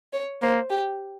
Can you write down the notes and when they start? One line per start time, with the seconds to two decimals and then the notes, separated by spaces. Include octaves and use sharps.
0.13 C#5
0.42 A#3 C5
0.70 G4